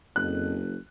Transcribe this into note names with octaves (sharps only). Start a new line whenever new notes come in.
F#1 F2 F#6